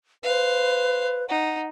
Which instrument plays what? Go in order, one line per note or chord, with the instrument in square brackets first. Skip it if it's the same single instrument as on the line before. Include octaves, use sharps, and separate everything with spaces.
[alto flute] B4 [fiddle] C5 F5
[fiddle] D#4 [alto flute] F#5